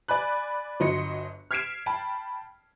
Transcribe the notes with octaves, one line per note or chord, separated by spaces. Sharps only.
D5 G#5 B5 F#6
G1 F#3 D#5 C6 C#7
F6 G#6 B6 C7 D7 E7
G5 A5 B5